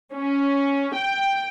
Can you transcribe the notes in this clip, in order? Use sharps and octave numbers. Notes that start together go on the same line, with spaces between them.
C#4
G5